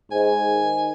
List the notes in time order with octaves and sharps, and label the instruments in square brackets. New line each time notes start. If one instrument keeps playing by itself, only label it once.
[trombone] G#2 [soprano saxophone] G#5
[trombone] D#3